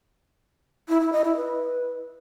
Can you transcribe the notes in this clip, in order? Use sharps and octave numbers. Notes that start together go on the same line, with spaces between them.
E4
E4
D#5
E4
B4